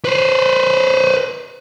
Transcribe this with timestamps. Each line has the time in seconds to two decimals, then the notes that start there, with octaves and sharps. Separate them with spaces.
0.05 B4 C5